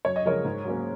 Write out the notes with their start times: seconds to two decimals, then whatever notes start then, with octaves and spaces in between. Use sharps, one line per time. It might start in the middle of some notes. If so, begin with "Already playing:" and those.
0.05 F#2 C#5
0.16 D#5
0.25 C#3 F3 G#3 A#4 C#5
0.45 G#2
0.65 F#3 A#3 C#4